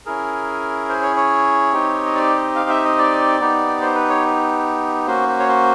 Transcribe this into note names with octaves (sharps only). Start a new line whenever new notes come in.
C#4 E4 G#4 A#4
C5
C#5
C#5
C4 D#4 G4
D#5
D5
D#5
F5
E5
D#5
D5
B3 D#4 G4
C5
B4
C#5
A#3 C#4 F#4 C5
C5
C#5
C5